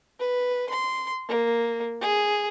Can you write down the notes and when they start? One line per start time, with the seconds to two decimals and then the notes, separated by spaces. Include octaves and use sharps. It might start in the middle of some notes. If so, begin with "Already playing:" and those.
0.20 B4
0.69 C6
1.28 A#3
2.01 G#4